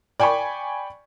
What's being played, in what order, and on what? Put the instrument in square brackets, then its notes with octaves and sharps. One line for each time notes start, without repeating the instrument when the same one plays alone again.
[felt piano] D5 G5 G#5 B5 C#6